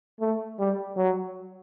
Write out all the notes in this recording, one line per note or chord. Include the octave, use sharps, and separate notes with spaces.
A3
G3
F#3